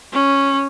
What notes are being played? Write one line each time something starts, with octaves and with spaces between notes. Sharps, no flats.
C#4